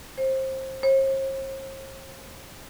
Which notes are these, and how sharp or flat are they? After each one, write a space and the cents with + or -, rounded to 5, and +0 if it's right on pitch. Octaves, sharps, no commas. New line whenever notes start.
C5 +20
C5 +45